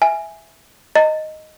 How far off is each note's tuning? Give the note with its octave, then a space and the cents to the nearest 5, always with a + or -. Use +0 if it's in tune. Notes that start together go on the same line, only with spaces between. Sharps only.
E5 +0 G#5 +0
D#5 +0 A#5 -40